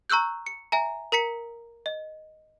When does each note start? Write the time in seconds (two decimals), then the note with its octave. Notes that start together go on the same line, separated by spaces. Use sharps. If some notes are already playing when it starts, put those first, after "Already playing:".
0.10 A#5 C#6 E6 F#6 G6
0.46 C#7
0.72 E5 G#5 A#5
1.12 A#4 A#5 B6 C#7
1.86 D#5